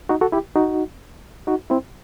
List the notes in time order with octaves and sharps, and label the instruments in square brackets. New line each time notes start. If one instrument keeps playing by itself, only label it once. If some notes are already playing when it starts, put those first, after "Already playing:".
[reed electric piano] D#4 F#4
F#4 A4
E4 G4
D#4 F#4
D#4 F#4
C4 E4